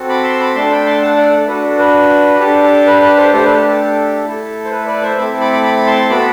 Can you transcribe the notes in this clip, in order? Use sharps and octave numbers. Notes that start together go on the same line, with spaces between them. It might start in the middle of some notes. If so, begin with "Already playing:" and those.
Already playing: C4 F#4 A4
B5 D6
C6 E6
B5 D6
A3 D4 A4 A5 C6
G5 B5
A5 C6
F#5 A5
D5 F#5
A4
D4 F#4 A4 B4
A4
B4
D4 G4 A4
A4
B4
B4
A4 C5
A3 D4 G4 A4 C5
B4
A4
A4
A3 E4 A4
C5
B4
B4 D5
C5 E5
A3 C4 E4 A4 B5 D6
B5 D6
B5 D6
B5 D6
A5 C6
B3 F#4 A4 B5 D6